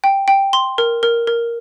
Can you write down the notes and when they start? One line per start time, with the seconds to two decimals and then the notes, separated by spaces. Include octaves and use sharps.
0.04 G5
0.28 G5
0.53 C6
0.78 A#4
1.03 A#4
1.27 A#4